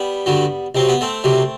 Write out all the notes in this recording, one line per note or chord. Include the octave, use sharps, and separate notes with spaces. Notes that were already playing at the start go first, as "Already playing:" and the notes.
Already playing: G3 B3
G2 D3 F#3
C2 C3 F#3 C4
B3
A3 C4
C2 C3 F#3